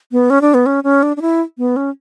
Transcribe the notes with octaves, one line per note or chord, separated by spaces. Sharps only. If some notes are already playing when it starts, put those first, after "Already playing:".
B3
C#4
D4
B3
C#4
C#4
D4
D4
E4
B3
C#4